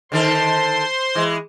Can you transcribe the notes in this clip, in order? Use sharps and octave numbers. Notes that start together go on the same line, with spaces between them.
D3 D#3 A4 C5 C6
E3 G#3